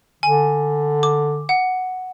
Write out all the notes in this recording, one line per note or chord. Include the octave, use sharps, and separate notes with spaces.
D3 G#5
D6
F#5